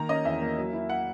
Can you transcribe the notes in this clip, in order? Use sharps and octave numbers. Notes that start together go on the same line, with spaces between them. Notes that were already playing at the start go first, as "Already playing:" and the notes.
Already playing: D#3 A#3 A#5
C#4 D#5
E2 E5
A#3
F#3
E4
F#5